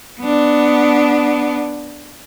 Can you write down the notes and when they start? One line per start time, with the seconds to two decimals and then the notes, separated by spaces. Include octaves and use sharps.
0.21 B3 D4